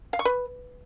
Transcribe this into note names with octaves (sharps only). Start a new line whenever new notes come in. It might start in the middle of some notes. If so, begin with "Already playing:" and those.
F5
C#6
B4